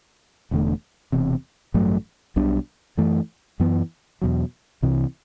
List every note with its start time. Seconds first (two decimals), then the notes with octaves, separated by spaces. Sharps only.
0.51 E1 E2 D3 A3
1.12 E1 E2 C3
1.74 A1 G2 F#3 A3
2.36 B1 B2 G3 D4
2.97 F#2 E3 A3
3.60 F#2 E3 B3
4.22 E2 B2 F#3
4.83 C2 C3 E3